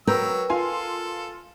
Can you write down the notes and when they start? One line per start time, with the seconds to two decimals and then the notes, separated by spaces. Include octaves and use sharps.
0.07 F#3 A#4 B4 G5 E6
0.50 F4 A4 G#5 C6